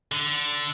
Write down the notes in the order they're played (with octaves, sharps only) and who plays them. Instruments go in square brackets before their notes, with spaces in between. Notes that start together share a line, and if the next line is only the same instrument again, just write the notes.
[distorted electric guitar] D3